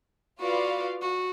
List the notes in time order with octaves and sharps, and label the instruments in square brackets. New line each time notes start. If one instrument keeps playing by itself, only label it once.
[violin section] F4 B4 D5 F5 [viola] F#4
[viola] F#4